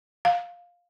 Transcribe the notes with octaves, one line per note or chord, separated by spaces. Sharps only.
F5